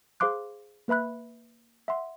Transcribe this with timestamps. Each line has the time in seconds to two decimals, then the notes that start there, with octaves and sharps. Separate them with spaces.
0.20 G#4 C5 F5 C6 D6 F#6
0.88 A#3 B4 E5 B5 F#6
1.88 E5 F#5 C6